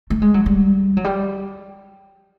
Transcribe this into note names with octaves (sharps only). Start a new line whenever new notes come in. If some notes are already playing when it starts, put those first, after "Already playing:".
A3
G#3
F#3
G3
F#3
G3